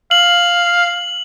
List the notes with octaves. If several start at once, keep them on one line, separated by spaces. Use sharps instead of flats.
F5 F#7